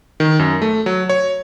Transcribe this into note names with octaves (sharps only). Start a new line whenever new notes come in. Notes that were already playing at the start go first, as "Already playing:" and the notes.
D#3
F#2
A3
F#3
C#5